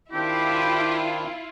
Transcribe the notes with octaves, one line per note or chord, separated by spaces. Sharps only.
D#3 C4 D4 E4 F4 G4